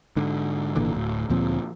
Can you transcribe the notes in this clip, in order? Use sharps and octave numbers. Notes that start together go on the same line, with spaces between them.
G#2 D3
G#1 A#2 D3 E3
D1 A2
D2 A#2 F3 C4